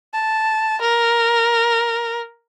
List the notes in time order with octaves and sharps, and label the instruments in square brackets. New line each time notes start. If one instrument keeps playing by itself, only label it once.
[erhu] A5
A#4